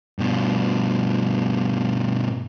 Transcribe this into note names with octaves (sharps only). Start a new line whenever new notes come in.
G2 B2